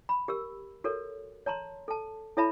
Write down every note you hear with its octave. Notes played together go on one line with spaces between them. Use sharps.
B5
G4 A#4 E6
F#4 A4 A#4 C#5
C#5 A5 A#5 C6
A4 A5
E4 A4 C#5 E5 A5 B5